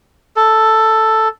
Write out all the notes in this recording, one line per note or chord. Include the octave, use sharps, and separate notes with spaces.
A4